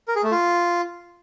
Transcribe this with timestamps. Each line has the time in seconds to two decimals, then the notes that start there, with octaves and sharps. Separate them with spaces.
0.08 A#4
0.16 G#4
0.24 A3
0.31 F4